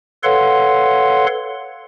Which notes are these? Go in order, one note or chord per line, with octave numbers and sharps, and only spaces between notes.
A4 B4 C#5 F5 F#5 C6